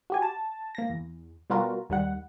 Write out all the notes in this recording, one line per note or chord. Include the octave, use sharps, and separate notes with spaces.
F#4 G4 G#5
A5
A#3 A#6
E2
B2 G3 B3 F4 F#4 A#4
D#2 D#3 G3 F#5